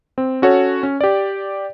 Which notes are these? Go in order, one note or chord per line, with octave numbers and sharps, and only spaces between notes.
C4
C#4 F#4 A4 C#5
C#4
G4 D5